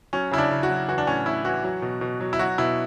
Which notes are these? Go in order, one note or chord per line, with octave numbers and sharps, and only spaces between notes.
F#3 C#4
C#3 E4
D4
C#3
F#4
F#3
E3 F#4
D4
A2 C#4
A2 E4
E3 F#4
F#3
B2
B2
F#3
E4
F#3 F#4
B2 E4